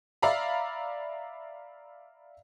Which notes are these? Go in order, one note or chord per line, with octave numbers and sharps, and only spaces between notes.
D5 E5 F5 A#5 B5